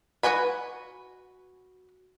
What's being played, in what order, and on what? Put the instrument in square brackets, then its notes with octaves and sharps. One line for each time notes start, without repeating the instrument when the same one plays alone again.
[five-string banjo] F#4 A4 B4 G#5 B5